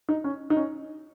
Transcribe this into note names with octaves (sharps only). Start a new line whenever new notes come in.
D#4
C#4
D#4
C#4